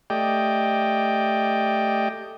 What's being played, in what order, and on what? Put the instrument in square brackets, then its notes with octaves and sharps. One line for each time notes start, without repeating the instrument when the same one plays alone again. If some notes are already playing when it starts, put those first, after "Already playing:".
[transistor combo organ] A3 G4 D5 D#5 G5